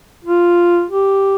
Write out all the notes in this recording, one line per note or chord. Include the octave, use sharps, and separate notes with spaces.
F4
G4